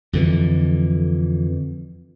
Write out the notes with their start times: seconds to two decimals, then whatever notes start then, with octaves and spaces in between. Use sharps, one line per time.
0.13 F2 D3 E3